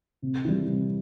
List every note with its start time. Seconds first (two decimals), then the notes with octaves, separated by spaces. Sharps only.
0.22 C3
0.45 E3 G3
0.68 C3